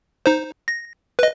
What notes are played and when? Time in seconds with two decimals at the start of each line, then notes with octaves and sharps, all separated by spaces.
0.26 D#4 C5
0.68 A#6
1.19 B4 D#5